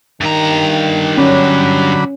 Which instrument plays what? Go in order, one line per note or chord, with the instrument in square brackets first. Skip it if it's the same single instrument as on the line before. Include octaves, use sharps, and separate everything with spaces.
[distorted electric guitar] G2 A#5 [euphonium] D#3
[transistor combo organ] D3 F#3 B5 [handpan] C#4